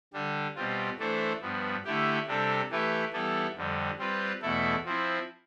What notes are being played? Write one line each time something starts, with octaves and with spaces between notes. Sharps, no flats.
D3 G3 D4
B2 G3 C4 F4
E3 A3 D4 A4 C5
G2 F3 B3
D3 A3 E4 G4
C3 G3 D4 A4
E3 A3 E4 G4 B4
E3 G3 B3 E4 A4
F2 D3 G3
G3 C4 F4 B4
E2 B2 A3 E4 A4
F3 C4 E4